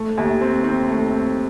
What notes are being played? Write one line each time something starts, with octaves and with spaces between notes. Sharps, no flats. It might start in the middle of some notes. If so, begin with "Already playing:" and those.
Already playing: A3
D#2
C4
C4
A3
C4